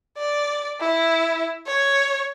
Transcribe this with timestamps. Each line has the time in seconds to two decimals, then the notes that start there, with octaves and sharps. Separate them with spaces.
0.18 D5
0.80 E4
1.67 C#5